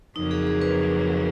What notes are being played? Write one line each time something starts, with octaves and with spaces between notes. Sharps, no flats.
F2 C#3 F#3 A#3 D#4
G#4
G#4
B4